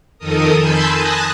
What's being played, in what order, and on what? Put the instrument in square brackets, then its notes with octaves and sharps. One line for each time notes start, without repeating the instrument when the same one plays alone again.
[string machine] F2 D#3 A4 A#4 D#6
G#5 A5 B5 C6 E6 G6
G#5 A5 D#6 F#6 A#6